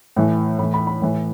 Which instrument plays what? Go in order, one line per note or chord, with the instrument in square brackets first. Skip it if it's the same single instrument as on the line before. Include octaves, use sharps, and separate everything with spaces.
[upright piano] A2 E3
A2 E3 B5
B5
B5
A2 E3